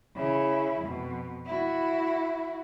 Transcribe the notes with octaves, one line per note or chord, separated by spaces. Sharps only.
C#3 E4
F2 B2
E4 F#4